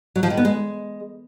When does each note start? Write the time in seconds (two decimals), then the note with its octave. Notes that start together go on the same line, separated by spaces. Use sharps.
0.16 F#3
0.23 F3
0.30 D#3
0.37 B3
0.45 G#3